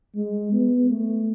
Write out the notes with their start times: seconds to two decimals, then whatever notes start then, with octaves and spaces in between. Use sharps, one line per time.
0.16 G#3
0.53 B3
0.89 A3